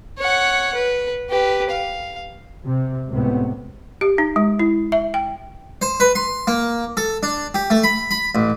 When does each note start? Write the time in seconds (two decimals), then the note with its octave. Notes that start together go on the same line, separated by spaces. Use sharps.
0.18 C#5 F#5
0.75 B4
1.30 G4 B4
1.70 F5
2.66 C3
3.09 C#2 A2 C3 B3
4.01 G4
4.18 D#4
4.36 G#3
4.59 E4
4.92 E5
5.14 G5
5.82 C5
6.00 B4
6.15 C6
6.47 A#3
6.97 A4
7.23 D4
7.54 G4
7.70 A3
7.84 B5
8.11 B5
8.35 A1